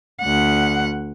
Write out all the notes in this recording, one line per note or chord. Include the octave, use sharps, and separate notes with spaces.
D2 F#5